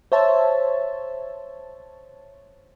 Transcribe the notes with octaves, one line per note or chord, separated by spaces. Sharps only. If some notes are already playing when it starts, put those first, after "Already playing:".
C5 C#5 E5 A5